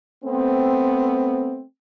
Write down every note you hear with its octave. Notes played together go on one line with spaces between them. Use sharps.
A3 B3 C4